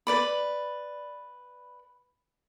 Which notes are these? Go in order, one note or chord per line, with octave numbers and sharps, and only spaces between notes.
B4 D5 B5